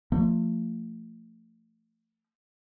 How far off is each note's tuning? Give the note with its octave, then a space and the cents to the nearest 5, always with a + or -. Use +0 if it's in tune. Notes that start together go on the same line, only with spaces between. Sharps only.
F3 +0 A3 +35